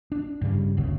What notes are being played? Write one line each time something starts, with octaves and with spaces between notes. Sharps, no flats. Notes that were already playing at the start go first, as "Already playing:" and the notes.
D4
G2 C#3 G3
F#1 D2 C#3